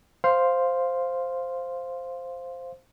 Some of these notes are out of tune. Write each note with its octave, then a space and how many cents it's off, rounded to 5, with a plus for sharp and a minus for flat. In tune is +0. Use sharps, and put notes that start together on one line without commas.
C5 +0 F5 +0